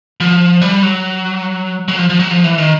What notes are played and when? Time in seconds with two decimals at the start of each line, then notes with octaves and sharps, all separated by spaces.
0.21 F3
0.62 G3
0.83 F#3
1.88 F#3
1.98 F3
2.10 F3
2.20 F#3
2.31 F3
2.44 E3
2.58 D#3